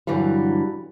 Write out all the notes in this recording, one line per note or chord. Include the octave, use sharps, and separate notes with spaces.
G2 D3 E3 F#3 G3